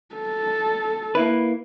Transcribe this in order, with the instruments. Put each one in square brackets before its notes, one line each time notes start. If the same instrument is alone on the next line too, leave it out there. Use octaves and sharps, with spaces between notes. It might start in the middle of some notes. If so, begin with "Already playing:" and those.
[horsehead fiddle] A4
[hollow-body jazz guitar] A#3 E4 B4